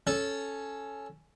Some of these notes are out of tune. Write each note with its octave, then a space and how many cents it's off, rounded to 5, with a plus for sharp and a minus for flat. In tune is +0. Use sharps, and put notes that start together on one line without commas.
C#4 +0 A4 -10